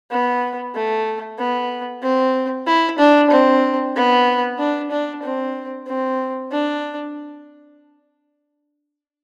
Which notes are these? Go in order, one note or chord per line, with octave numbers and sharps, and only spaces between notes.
B3
A3
B3
C4
E4
D4
C4
B3
D4
D4
C4
C4
D4